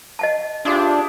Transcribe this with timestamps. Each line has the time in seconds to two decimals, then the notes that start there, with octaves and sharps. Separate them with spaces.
0.19 D#5 F#5 A5
0.65 D4 E4 F4 G4 G#4 C5 D5